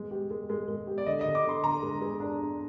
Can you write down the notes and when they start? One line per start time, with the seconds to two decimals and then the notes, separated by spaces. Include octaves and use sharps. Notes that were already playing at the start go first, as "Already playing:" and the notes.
Already playing: G#3
0.11 G4
0.31 G#3
0.50 G#3
0.68 G#3
0.87 G4
0.98 D5
1.06 D3 D#5
1.21 D#5
1.25 D3
1.35 D6
1.45 D3 C6
1.64 D3 A#5
1.82 G#3
2.02 G#4
2.20 D4
2.39 D4